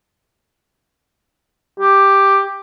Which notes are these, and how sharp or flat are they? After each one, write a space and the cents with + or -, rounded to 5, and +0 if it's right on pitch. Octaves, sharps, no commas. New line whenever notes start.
G4 +5